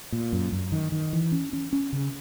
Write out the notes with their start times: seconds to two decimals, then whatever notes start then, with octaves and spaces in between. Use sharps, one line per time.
0.12 A#2
0.33 F#2
0.52 F#2
0.72 D#3
0.92 D#3
1.13 E3
1.32 C#4
1.53 C#4
1.73 C#4
1.93 C#3